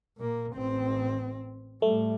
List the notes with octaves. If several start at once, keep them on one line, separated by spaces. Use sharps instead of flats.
A#2 A#3
A1 C4
A2 G3 A3